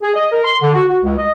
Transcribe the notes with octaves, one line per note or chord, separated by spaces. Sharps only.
G#4
D#5
A#4
C6
D3
F#4
F#4
C#2
D#5